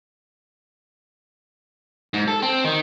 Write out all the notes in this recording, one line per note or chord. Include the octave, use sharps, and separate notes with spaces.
G#2
A4
C4
D#3